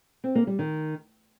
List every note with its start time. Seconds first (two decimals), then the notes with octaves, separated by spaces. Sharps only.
0.24 C4
0.35 A#3
0.47 G3
0.59 D#3